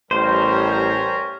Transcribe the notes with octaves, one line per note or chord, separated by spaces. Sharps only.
A1 G3 C#4 A#4 C5